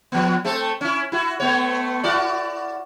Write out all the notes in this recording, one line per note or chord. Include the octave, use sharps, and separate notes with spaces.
F3 B3
A3 C4 A4
C#4 E4
E4 F#4
A3 B3 C#5
E4 F#4 D5